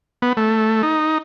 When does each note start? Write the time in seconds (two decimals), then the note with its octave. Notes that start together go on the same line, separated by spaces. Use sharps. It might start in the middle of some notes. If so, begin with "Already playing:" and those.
0.22 B3
0.37 A3
0.83 D#4